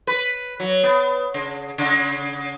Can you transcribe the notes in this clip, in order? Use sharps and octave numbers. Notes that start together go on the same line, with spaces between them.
B4
F#3
B3
C#3
C#3